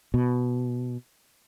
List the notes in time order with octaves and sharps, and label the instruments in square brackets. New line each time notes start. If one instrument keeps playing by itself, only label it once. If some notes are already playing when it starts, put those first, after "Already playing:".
[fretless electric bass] B2